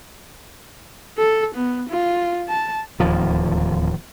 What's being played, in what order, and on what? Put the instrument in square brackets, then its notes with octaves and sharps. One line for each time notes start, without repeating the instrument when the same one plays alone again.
[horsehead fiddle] A4
B3
F4
A5
[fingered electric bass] D1 D#2 F3